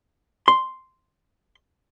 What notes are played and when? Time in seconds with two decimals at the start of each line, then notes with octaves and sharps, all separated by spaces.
0.48 C6